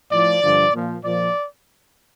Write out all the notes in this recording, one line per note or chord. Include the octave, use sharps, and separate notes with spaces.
A2 F3 D5
G2 D3 F3
A#2 F3
A#2 F3 D5